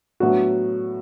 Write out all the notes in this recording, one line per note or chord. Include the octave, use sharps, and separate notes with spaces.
A2 F#3 B3 D4 F#4